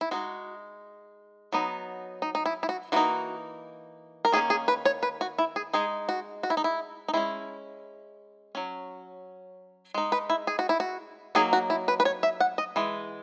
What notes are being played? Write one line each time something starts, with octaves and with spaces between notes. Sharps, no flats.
E4
G#3 D#4 F#4
F#3 B3 D#4
D#4
D#4
E4
E4
F#4
E3 A#3 D#4 F#4
A#4
D#3 A#3 C#4 G#4
G#4
B4
C#5
B4
F#4
E4
G#4
G#3 D#4 G#4
F#4
F#4
E4
D#4
E4
D#4
G#3 C#4 E4
F#3 C#4
G#3 D#4
B4
E4
G#4
F#4
E4
F#4
F#3 A#3 D#4 G#4
F#4
E4
B4
B4
C#5
E5
F#5
D#5
E3 G#3